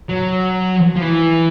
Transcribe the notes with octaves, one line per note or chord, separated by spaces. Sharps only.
F#3
F3
E3